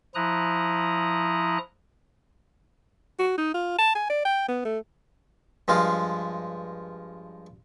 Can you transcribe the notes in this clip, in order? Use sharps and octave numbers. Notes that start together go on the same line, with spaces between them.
F3 E4 A#5 D#6 F#6
F#4
D#4
F4
A5
G#5
D5
G5
B3
A3
G2 F3 G#3 F4